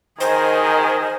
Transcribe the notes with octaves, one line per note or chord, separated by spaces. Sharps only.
D#3 G#4 A#4 C5 D#5 G#5